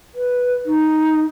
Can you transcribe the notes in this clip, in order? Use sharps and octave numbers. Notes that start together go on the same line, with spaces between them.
B4
D#4